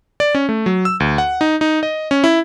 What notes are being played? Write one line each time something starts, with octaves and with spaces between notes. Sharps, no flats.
D5
C#4
A3
F#3
E6
D2
F#5
D#4
D#4
D#5
C#4
E4